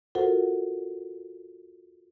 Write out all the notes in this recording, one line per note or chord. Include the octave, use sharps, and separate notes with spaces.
F4 F#4 A4 A#4 C5 F#5